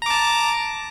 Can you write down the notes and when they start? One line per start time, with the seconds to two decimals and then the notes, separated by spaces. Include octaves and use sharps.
0.02 A#5
0.06 D6
0.10 A5